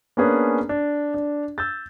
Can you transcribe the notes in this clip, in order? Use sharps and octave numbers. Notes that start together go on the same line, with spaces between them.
A#3 B3 C#4 D4 G#4 B4
D4
D4
E6 G6 A6